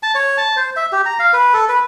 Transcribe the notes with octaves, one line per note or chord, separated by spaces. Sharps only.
A5
C#5
A5
C5
E5
G4
A#5
F5
B4
A4
B4